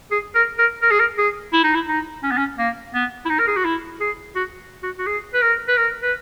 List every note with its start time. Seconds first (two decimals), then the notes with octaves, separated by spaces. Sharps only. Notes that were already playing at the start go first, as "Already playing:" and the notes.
0.12 G#4
0.35 A#4
0.59 A#4
0.82 A#4
0.91 G#4
1.00 A#4
1.18 G#4
1.53 E4
1.63 D#4
1.75 E4
1.88 D#4
2.23 C#4
2.31 B3
2.38 C#4
2.58 A#3
2.94 B3
3.25 E4
3.30 D#4
3.39 A#4
3.48 G#4
3.57 F#4
3.65 E4
4.00 G#4
4.36 F#4
4.83 F#4
4.99 F#4
5.07 G#4
5.34 B4
5.42 A#4
5.68 B4
5.77 A#4
6.03 B4